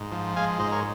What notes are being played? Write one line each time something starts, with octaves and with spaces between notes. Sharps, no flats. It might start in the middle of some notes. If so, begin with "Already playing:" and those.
Already playing: G#2
F3
G#3 F5 G#5
G#2 C5 D#5
A#4 C#5